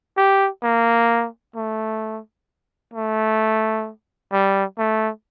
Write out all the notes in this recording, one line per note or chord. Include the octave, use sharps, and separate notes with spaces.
G4
A#3
A3
A3
G3
A3